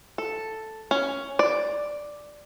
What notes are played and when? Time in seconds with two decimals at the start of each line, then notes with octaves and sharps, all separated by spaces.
0.18 A4
0.91 C#4
1.39 D5